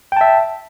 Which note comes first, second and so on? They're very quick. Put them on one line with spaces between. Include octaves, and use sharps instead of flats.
G5 A5 E5